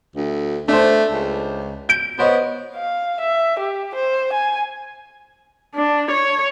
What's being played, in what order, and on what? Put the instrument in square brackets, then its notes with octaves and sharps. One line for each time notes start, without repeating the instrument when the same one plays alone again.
[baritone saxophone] D2
[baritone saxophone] A3 [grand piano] D4 C5
[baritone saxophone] C#2
[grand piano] G6 D7
[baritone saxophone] B3 [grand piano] C5 C#5 D#5
[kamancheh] F5
E5
G4
C5
G#5
[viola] D4
C#5